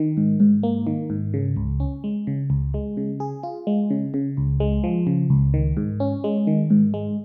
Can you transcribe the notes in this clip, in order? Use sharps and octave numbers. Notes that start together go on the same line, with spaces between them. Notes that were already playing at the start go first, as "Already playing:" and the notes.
Already playing: D#3
G#2
G#2
A#3
D#3
G#2
C#3
C#2
C#4
G#3
C#3
C#2
G#3
C#3
G#4
F4
G#3
C#3
C#3
C#2
G#3
F3
C#3
C#2
D#3
G#2
C#4
G#3
D#3
G#2
G#3